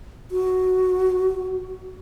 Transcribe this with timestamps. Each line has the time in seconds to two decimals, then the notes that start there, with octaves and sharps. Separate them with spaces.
0.31 F#4